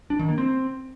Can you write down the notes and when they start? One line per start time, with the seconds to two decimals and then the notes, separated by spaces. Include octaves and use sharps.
0.10 D4
0.19 D#3
0.29 A#3
0.38 C4